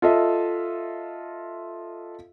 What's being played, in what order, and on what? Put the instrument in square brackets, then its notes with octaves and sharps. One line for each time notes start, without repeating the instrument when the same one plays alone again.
[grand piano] F4 A4 D#5 E5